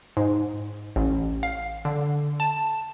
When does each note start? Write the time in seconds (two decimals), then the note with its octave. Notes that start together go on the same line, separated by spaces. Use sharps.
0.17 G#2
0.96 A1
1.43 F5
1.85 D3
2.40 A5